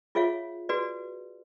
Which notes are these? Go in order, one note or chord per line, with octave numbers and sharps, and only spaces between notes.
F4 G#4 C#5 E5 F5
F#4 G#4 B4 D5